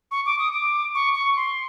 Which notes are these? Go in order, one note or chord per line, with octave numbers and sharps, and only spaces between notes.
C#6
D6
D#6
D6
C#6
C#6
C6